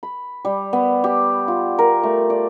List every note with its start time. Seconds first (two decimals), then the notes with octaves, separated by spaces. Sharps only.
0.03 B5
0.45 G3
0.73 B3
1.04 G4
1.48 F4
1.79 A#4
2.03 A3
2.30 D5